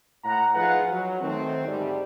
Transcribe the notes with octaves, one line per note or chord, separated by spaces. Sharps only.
A2 F#5 A#5
F3 D#4 F4 G#4 B4 F#5
F#3
D#3 A3 C4
G#2 D3 G3